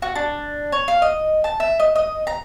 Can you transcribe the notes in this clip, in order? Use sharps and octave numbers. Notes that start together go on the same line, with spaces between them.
F#4
D4
C#5
F5
D#5
A5
E5
D#5
D#5
A#5